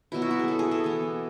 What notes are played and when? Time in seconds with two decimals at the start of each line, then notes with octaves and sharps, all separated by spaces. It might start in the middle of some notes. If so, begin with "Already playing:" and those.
0.12 B2 F#3 B3 E4
0.22 F#4
0.31 E4
0.39 G#4
0.48 A4
0.59 G#4
0.71 A4
0.84 E3 B3